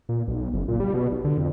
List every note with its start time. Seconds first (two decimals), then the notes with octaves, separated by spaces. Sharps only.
0.09 A#2
0.28 B1
0.53 F#1
0.68 A#2
0.80 G3
0.94 B2
1.12 B1
1.24 D3
1.38 F2